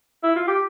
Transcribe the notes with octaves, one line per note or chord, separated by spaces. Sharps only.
E4
F4
G4